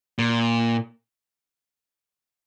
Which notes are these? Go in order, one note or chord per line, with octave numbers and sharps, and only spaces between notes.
A#2